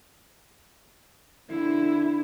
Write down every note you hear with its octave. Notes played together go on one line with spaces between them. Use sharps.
D3 E4